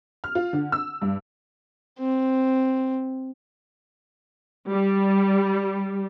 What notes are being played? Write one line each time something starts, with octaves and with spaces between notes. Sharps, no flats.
F6
F4
D3
E6
G2
C4
G3